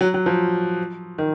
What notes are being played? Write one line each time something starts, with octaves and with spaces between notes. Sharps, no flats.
F#3
F#3
F3
D#3